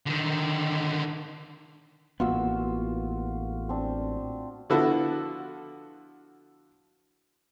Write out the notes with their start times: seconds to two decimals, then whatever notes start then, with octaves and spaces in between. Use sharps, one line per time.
0.06 D3 D#3
2.20 A1 A#3 B3 F4 F#4 E6
3.69 C4 D4
4.70 D3 F3 B3 E4 F#4 A4